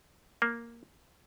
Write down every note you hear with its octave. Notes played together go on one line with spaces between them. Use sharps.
A#3